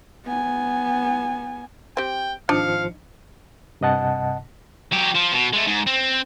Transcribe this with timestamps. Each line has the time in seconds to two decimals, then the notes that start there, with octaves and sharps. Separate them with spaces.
0.25 B3 G#5
1.97 C4 G4 G5
2.49 G#1 F3 D4 D#4 F5 C#7
3.81 G2 C3 D#5 F#5 A5
4.92 F#3 G4
5.15 F3
5.33 B2
5.53 G#3 A3
5.67 G#2
5.87 C4